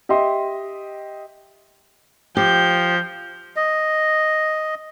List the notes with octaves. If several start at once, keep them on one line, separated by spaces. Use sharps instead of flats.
G4 D#5 E5 C6
F3 G4 G6
D#5